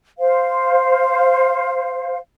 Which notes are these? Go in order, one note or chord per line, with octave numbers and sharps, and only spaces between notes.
C5 F5